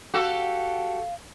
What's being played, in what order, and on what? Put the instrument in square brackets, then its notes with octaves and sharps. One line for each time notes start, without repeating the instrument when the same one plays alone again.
[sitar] F#4 G4 A4 [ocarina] F5